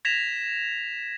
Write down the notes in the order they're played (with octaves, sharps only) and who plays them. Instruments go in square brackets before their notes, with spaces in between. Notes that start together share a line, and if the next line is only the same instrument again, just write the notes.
[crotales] G#6 A#6 B6 E7 F7